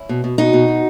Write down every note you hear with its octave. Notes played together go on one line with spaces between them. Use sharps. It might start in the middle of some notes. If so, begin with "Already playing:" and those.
Already playing: C#4 E4
B2
B2
B2 D#4 F#4
B2
B2